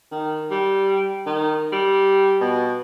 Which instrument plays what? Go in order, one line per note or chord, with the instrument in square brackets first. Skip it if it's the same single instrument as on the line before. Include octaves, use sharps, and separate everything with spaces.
[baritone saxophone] D#3
G3
D#3
G3
B2